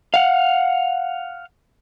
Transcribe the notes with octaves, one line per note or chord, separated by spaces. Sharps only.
F5 F#5